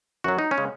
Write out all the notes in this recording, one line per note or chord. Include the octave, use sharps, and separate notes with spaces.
F#2 F#3 F#4
D#4
C#4
C#3 G#3